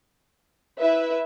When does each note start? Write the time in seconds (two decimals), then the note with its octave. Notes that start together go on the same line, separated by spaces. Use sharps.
0.79 E4 B4 E5